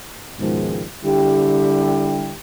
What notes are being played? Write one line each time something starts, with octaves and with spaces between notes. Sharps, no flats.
C#2 G#2 B2 D#3 F3 G#3
D3 G3 E4 G4